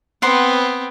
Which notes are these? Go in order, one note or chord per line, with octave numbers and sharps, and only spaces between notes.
B3 C4 B4 C5 F#5